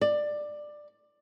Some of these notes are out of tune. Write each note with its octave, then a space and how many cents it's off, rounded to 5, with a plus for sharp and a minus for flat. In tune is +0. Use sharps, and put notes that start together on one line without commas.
D5 +15